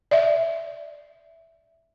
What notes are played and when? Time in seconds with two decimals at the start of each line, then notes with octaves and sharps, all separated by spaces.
0.11 D5 E5